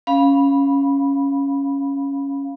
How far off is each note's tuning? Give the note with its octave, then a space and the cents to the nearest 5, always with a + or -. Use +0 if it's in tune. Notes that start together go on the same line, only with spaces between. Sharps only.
C#4 +0 F5 +0 B5 -20